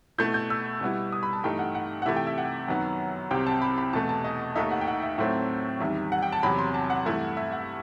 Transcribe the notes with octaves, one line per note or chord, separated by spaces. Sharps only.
B2 A3 E4 G6
G6
E6
B2 G3 B3 E4
D#6
B5
A5
G2 E3 A3 D#4 G5
F#5
F#5
F#5
C3 E3 A3 E4 E5
G5
E5
F#5
F#2 D#3 F#3 B3
C2 C3 F#3 C4 G5
A5
B5
B5
E2 B2 A3 A5
A5
D#5
D#2 D#3 A3 D#4 E5
F#5
G5
F#5
E5
A2 F#3 A3 C4 E4 E5
E2 D#3 G3 E5
F#5
G5
A5
E2 C3 F#3 B5
C6
A5
F#5
G2 E3 A3 E4
E5
F#5